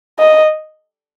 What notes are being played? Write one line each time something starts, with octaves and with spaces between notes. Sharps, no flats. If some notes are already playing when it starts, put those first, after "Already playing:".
D#5